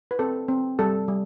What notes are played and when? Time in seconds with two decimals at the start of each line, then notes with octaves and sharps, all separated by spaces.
0.11 B4
0.19 C4 A4
0.48 C4
0.79 G3 A4
1.08 G3